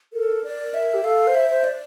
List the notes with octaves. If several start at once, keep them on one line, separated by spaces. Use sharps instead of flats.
A4 A#4
D5
E5
G4
A4 F5
C5
E5
C5
D5